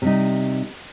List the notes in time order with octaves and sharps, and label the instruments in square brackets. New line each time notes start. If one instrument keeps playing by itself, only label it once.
[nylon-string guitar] C3 G3 D#4